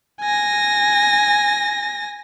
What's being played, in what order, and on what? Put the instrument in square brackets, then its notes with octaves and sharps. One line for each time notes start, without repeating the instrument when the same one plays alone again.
[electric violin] G#5 A#6